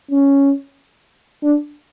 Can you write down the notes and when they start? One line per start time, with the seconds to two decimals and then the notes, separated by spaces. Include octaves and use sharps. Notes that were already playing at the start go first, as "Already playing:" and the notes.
0.11 C#4
1.43 D4